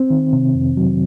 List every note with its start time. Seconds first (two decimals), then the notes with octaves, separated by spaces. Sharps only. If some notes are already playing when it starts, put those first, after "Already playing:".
Already playing: C4
0.10 D#3
0.33 C3
0.55 F2
0.77 F#3